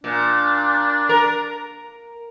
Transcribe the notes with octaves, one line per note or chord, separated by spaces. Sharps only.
A#2 D4
A#4